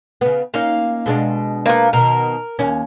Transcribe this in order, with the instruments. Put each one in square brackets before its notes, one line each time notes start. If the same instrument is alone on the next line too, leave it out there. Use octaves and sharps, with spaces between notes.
[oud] C#3 B3
[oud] A#3 C#4 D#4 [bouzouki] F5
[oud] B2 G#3 D4
[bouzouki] A#3 B3
[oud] B2 D#3 [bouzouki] A#4
[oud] D#2 A#3 C#4